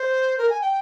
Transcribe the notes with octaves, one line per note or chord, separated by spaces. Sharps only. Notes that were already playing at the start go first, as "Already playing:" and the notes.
Already playing: C5
A#4
G#5
G5